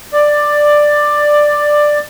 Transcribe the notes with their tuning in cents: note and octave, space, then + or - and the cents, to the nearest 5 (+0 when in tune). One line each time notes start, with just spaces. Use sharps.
D5 +10